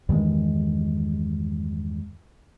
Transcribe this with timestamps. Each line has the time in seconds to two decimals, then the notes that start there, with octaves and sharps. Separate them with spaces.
0.09 E2 G2 D#3 G#3